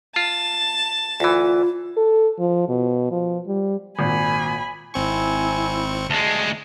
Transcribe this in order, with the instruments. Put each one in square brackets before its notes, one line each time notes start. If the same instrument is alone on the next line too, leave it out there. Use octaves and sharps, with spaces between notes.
[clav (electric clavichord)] F4 [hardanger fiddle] A5
[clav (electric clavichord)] D2 E3 [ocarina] F4
[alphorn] A4
F3
B2
F3
G3
[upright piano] G#1 A#2 [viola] G#5 B5
[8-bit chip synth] G#1 C4 C#6 [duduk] E4 [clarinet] G#5
[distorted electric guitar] D2 G#3 [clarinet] A5